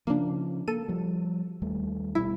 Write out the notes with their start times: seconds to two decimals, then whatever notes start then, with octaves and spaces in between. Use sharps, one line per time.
0.07 C#3 F3 A#3 D4
0.68 A#3 A4 D#7
0.88 F3 G3
1.62 D#2 G3 A3
2.15 D#1 B2 G3 E4